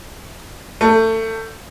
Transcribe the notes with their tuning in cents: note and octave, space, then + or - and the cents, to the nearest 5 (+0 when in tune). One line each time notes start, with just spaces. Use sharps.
A3 +25